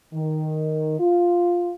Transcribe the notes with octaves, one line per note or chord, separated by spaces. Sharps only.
D#3
F4